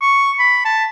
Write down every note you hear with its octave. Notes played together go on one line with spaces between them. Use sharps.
C#6
B5
A5